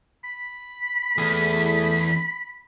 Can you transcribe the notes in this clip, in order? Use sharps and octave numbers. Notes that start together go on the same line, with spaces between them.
B5
E2 A3 G#4